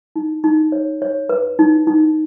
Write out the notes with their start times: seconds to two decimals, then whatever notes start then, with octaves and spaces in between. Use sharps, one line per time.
0.16 D#4
0.44 D#4
0.72 C#5
1.02 C#5
1.29 B4
1.59 D#4
1.87 D#4